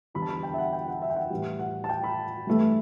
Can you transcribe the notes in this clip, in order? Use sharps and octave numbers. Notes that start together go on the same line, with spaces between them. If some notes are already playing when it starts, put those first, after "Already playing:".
E2 D3 G3 B5
A5
B5
G5
E5
F#5
G5
F#5
E5
G5
F#5
A2 E3 G3
F#5
A5
G5
B5
G2 E3 A3